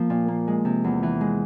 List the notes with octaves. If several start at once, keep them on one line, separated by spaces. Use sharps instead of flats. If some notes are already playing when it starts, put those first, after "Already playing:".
Already playing: F3 A#3
A#2
A#3
G#3
C3
E2
E3
G#3